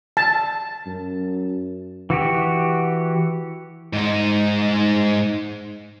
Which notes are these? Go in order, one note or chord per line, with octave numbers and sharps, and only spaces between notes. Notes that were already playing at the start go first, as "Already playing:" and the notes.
A5
F#2
E3 F#4 G4
G#2 D#4